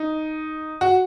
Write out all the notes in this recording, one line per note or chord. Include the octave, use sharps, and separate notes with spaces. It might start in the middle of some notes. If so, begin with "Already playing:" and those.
Already playing: D#4
F#4